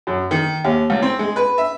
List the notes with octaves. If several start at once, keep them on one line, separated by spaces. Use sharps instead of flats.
F#2
D#3
D#2
C#2
C4
G#3
B4
E5